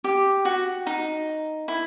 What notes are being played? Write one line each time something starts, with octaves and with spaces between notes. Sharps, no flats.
G4
F#4
D#4
E4